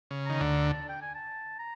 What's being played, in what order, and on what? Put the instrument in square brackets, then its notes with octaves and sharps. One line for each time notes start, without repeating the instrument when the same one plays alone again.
[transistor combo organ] C#3
[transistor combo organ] D#3 [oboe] A#5
[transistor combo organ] D2 D3
[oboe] A5
G5
G#5
A5
A#5